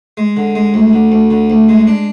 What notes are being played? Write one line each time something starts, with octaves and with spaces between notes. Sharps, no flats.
G#3
D3
G#3
D2
D3
D2
D3
D2
G#3
D4